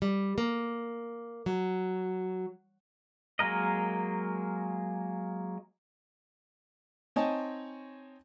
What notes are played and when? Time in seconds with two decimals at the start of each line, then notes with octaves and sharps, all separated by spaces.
0.02 G3
0.38 A#3
1.46 F#3
3.39 F#3 G#3 A#3 A#4 D#5
7.16 C4 D#4 C#5 D#5 G#5 A5